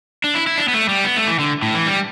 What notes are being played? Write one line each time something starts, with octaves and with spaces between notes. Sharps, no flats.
D4
E4
E4
D4
B3
A3
G3
B3
A3
E3
D3
A2
E3
G3